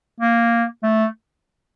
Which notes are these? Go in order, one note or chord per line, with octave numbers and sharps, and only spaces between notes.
A#3
A3